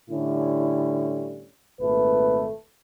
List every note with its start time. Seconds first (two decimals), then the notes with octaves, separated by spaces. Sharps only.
0.10 A2 D3 G3 C#4 E4
1.80 G#1 A#2 A3 B4